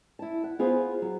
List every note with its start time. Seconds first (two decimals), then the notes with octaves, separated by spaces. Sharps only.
0.19 E4 A5
0.44 F#5
0.59 B3 F4 G#4 B4 C5
1.02 F#3